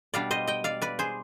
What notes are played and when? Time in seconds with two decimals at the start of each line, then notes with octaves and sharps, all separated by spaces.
0.14 B2 G3 D4 D5 F5
0.31 C5 D#5
0.47 D#5 G5
0.64 D5 F5
0.82 B4 D5
0.99 G#4 C5